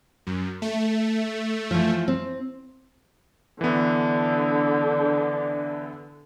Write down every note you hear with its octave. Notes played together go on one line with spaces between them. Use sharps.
F#2
A3
E3 F3
C4
D3 E3 B3 D4